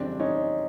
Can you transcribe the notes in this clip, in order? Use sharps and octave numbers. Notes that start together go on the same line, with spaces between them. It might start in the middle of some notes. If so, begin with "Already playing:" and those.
Already playing: F2 C#3 E3 G3 C4 D4
C#4 D#4